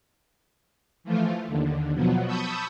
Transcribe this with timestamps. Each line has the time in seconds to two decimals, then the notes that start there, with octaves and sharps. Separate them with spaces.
1.04 E3 F3 A3 F4
1.47 D#2 D3
1.95 B2 F3 F#3 B3
2.27 A5 B5 C#6 D#6 E6 G6